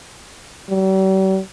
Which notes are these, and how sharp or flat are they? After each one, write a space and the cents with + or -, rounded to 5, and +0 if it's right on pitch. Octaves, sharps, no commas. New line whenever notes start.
G3 -45